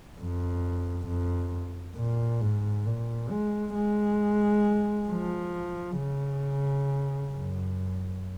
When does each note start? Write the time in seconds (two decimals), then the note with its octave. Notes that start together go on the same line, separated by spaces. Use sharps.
0.18 F2
1.07 F2
1.96 A#2
2.41 G#2
2.86 A#2
3.31 G#3
3.75 G#3
5.09 F3
5.98 C#3
7.32 F#2